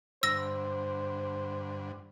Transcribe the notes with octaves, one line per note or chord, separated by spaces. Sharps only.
G2 D3 C5 E6 A#6